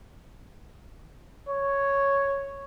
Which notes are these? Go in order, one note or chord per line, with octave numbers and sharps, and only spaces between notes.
C#5